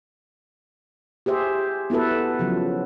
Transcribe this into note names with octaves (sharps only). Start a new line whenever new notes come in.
G4 G#4 C5 E5
B3 E4 F#4 A4 B4
C#3 F3 F#3